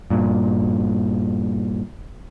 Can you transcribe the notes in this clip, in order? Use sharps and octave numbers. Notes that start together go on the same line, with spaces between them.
G2 A#2